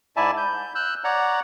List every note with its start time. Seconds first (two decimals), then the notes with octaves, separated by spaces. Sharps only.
0.17 G#2 E4 D5 E5 G#5 A5
0.37 G6
0.75 E6 F#6 G6
1.04 C#5 D5 F#5 A#5